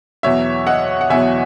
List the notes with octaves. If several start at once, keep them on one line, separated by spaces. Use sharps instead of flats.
E2 B2 F#3 C#5 E5
D#5 F#5
F#5
E2 B2 F#3 E5 G#5